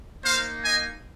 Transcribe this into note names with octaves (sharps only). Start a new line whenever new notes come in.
A#3 D#4 C5 F5
D#5 G#5